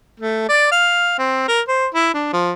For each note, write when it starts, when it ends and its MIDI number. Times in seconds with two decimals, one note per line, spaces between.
0.20 0.48 57
0.49 0.70 74
0.71 1.17 77
1.19 1.46 60
1.48 1.60 70
1.68 1.86 72
1.94 2.12 64
2.14 2.28 62
2.33 2.52 53